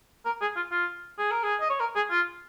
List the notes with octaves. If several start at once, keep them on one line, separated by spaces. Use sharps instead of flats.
A#4
G#4
F4
F4
G#4
A#4
G#4
D#5
C#5
A#4
G#4
F4